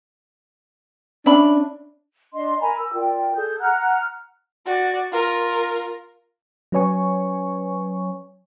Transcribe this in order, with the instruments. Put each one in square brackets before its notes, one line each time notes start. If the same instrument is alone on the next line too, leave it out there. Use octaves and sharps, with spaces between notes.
[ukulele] C#4 E5 B5 [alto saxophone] D4
[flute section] D4 D#5 C6
A#4 G#5 A#5 B5
E6
F4 A#4 D5 G5
G#4 A4 G6
F#5 A#5 F6 F#6
[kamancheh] F#4 D5
F4 A#4
[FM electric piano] F#3 C#4 B4 C#5 G#5 C#6